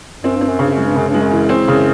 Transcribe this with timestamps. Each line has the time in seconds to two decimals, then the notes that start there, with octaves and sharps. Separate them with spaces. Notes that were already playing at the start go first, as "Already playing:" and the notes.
0.23 F#2 C4
0.36 G2 C4
0.48 F#2
0.59 G2 C#3
0.73 F#2 G#3
0.85 G2
0.96 F#2 C#3
1.09 G2 G#3
1.21 F#2
1.31 E3
1.49 C4
1.68 F#2 C#3